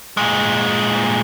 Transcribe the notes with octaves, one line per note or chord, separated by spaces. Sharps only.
A#2 G#3